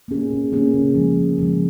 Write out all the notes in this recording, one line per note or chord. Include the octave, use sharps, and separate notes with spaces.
A#3 C#4 G#4
B2
A#3 C#4 G#4
C#3
F3 G#3
C#3
F3 G#3